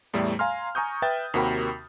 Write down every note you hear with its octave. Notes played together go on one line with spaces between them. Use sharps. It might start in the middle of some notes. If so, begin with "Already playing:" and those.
E2 A2 G3 A3
F5 G#5 A#5 C6 F6
G#5 A#5 C#6 D#6 G6
B4 E5 G5 G6 A6
D#2 C3 F#4 A#4 G5 B5